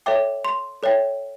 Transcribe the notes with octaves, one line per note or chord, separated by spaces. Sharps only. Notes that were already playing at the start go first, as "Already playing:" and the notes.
A4 C#5 E5 G5 D6
C6
A4 C#5 E5 G5